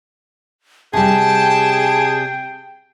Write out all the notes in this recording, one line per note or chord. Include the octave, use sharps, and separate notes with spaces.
C3 G3 G#4 G5 A5